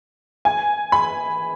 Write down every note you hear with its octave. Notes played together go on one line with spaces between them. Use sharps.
G#5
B5